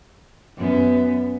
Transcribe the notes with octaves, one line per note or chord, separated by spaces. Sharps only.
F#2 B3